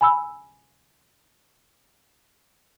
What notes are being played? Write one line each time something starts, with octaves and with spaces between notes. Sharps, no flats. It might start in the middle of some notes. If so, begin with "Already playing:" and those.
G#5 B5 E6